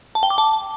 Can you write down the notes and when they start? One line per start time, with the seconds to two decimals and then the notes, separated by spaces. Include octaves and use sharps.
0.15 A5
0.23 G5
0.30 D6
0.38 A5